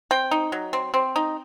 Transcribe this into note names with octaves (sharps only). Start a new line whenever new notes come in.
C4 G5
D#4
F#3
C4
C4
D#4